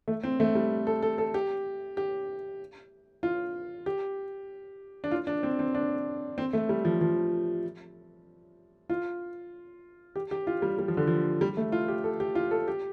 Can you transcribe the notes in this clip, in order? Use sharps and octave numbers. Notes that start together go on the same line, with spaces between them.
A3
C4
A3
G3
A4
A4
A4
G4
G4
F4
G4
D4
F4
D4
C4
C4
D4
C4
A3
G3
F3
F3
F4
G4
G4
F4
G3
G3
F3
D3
F3
G3
A3
F4
G4
A4
G4
F4
A4
G4